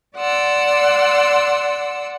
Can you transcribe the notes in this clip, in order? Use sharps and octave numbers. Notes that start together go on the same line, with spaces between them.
D5 F#5 C6 E6